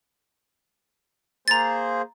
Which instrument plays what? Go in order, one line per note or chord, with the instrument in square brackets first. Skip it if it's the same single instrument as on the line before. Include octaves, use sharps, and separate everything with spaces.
[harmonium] A#3 G#4 C5 [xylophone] A#5 A6